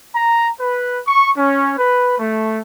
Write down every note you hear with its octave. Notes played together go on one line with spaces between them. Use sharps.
A#5
B4
C#6
C#4
B4
A3